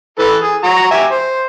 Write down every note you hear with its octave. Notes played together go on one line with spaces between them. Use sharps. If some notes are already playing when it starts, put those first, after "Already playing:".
E3 A4 B4
G#4
F#4 A#5
G4 E5 G#5
C5